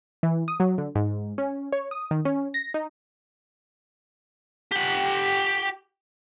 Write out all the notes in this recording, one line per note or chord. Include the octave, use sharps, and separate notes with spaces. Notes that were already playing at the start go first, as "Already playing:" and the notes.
E3
D#6
F#3
D3
G#2
C#4
C#5
D#6
D#3
C#4
A#6
D#4
G4 F#5